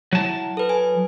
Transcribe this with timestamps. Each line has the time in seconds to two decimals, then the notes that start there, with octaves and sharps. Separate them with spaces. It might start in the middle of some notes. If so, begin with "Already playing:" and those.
0.13 F#3 E4 A5
0.57 A4 B4
0.69 G#5